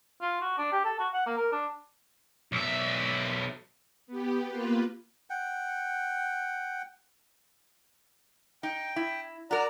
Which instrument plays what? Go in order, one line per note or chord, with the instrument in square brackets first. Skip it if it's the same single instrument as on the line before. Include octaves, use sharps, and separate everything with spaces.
[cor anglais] F4
F#4
D4
G4
A4
F#4
F#5
A#3
A#4
D4
[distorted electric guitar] B1 E5
[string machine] B3 G4
A#3 F4 B4
[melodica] F#5 G5
[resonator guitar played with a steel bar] D#4 [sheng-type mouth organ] G5
[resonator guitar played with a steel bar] E4
[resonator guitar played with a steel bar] F#4 A#4 [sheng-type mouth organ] D5 A#5